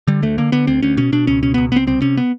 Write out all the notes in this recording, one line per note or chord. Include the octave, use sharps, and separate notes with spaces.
D3 G3
D2 A3
D3 A#3
D3 B3
D2 C4
D2 C#4
B2 C#4
B2 D4
C#2 C#4
B2 C#4
C#2 B3
C#2 B3 C4
C2 C4
C3 C#4
B3